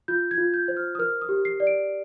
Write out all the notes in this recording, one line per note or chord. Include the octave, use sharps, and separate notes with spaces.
F4 G6
G#6
F4
G6
C5
F6
D#6
A#4 F6
D#6
G4
C7
D5
D7